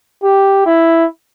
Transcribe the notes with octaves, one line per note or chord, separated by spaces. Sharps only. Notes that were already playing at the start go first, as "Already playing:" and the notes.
G4
E4